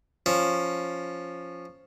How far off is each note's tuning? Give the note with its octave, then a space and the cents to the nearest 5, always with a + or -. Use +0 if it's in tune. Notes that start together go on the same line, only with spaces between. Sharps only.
F3 +0 C#4 +0